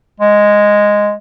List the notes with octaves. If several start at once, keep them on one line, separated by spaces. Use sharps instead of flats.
G#3